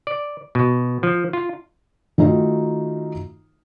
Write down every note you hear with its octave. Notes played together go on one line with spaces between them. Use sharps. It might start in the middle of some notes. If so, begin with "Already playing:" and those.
D5
B2
F3
F4
D#3 A3 D#4 F4 F#4